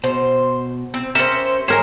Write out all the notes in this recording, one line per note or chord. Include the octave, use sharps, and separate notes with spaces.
B2 C5
C4
C#4 G4 A#4 C5 E5
D#2 G4 G#4 A#4 C5 C#5